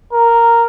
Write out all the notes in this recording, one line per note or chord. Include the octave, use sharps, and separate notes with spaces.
A#4